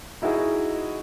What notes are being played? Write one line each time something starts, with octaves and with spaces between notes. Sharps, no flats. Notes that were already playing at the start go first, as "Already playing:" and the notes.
D#4 E4 F#4 G#4 D#5 E5